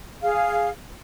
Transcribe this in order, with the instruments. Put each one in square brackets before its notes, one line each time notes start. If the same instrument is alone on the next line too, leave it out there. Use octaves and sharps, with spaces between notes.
[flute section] G#4 F5